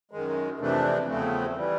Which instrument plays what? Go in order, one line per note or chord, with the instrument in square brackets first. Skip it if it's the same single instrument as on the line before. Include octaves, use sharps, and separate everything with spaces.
[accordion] F#2 D#3 G#3
F2 C3 E3 A3 D4
E2 C#3 F3 A3 C4
E3 G3